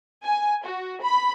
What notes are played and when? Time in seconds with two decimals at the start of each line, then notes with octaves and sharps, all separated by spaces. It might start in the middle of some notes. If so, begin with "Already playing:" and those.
0.24 G#5
0.65 F#4
1.01 B5